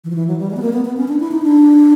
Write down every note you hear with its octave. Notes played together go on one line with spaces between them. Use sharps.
E3
F3
E3
F#3
G3
G#3
B3
A#3
B3
B3
C#4
D4
E4
D#4
D4